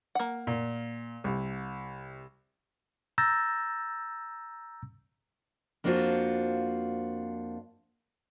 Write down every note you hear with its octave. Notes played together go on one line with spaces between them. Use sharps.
A#3 F#5
A#2
C2
A#5 E6 G6 A6 A#6
F2 A#3 D4 F4 F#4 C5